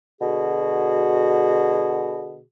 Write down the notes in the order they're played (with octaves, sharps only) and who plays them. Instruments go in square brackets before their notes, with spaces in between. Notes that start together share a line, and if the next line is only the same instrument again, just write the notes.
[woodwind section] B2 D3 F#4 G#4